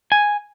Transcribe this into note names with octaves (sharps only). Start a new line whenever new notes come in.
G#5